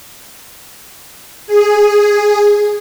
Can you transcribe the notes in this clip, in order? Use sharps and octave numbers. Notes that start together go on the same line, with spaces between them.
G#4